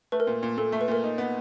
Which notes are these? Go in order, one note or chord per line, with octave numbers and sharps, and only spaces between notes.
A3 B4
A#4
A#2 B4
A#2
A#2 A4
A3
B4
A#2 A#4
D#4
B3